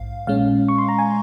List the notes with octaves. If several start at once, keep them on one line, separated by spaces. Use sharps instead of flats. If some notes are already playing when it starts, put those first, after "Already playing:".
Already playing: A#1 G#2 F5
A#2 G#3 C#4 F5
C#6
C6
A#5
G#5